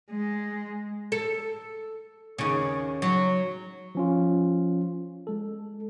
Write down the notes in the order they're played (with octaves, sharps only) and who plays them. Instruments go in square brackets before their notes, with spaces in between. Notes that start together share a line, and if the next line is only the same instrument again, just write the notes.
[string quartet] G#3
[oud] A4
D#2 C#3
F#3
[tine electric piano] F3 C#4 F4
G#3 A4